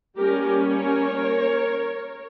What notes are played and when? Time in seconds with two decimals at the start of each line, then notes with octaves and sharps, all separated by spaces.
0.17 G3 A#3 C#4 G4 A#4
0.62 A#4 C#5